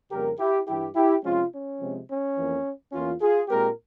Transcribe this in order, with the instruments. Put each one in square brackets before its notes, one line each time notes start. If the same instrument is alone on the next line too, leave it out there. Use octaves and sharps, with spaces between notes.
[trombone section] F2 C#3 G3 A#3 G4 A#4
E4 G4
G2 E3 G3 E4 G4
E4 G4
C3 F3 G#3 C4 C#4 F4
C#4
C3 F3 G#3 C4
C#4
F2 E3 A#3
E2 E3 A#3 C#4 F4
F4 G#4
A#2 G#3 C4 G4 A#4